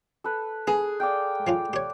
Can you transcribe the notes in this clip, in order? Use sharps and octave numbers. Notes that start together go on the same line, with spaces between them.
A4 B4
B3 G#4
D5 F5 G5
F3 C#4 F4
G4 C#5 D5